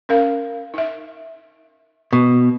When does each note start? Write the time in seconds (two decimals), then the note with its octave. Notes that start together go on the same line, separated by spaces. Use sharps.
0.09 C#4 A#4 F5
0.74 D#4 E5
2.13 B2